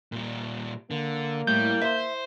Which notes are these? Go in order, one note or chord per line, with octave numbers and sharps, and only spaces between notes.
A#2 G3
D3 A#3
A2 G3 G6
B4 C5 E5